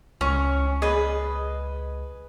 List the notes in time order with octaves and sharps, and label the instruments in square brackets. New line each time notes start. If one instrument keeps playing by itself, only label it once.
[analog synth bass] C#2 [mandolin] C#4 [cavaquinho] C#6
[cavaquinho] G#4 B4 A5 [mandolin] D#5